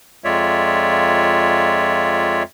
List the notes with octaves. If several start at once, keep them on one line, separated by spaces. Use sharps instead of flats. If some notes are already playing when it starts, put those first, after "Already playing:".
F2 G#3 F4 C#5 D5 E5